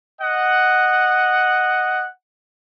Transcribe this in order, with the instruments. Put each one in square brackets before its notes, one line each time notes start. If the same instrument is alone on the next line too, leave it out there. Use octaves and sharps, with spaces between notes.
[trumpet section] D#5 F#5